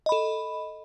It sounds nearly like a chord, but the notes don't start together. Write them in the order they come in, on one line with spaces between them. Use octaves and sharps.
D#5 B5 A4